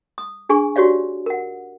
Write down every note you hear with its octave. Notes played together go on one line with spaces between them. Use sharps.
D#6
D4 G#4 G#5 C#6
D#4 F#4 G4 C#5 D5 F5
A#4 F#5